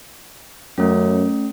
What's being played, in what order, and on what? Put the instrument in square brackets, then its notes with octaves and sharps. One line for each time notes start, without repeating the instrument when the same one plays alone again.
[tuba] F#2 [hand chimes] A3 C#4